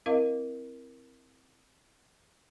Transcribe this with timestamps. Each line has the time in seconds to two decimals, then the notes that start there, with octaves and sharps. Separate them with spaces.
0.06 C4 E4 A#4 D#5 F5